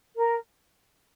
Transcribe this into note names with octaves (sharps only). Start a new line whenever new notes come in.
A#4